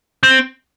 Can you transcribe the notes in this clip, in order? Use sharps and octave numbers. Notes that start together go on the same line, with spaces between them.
C4